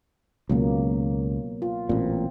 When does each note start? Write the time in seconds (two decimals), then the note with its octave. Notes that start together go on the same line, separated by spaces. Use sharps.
0.49 C#2 B2 F#3 A#3
1.62 F4
1.89 A1 A#2 C4